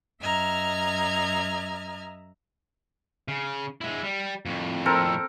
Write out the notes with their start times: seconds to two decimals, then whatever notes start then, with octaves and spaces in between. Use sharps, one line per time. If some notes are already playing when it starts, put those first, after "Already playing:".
0.22 F#2 D#5 E5 A#5 F6 G#6
3.28 C#3
3.81 G#3 E4
4.04 G3
4.45 F2 A2
4.86 C4 A4 A#4